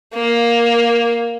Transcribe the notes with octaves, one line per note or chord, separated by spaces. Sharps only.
A#3